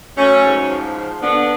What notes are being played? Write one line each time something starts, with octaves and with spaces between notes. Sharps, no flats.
F#3 A3 C#4
G#2
F3
F3
D3 B3 D4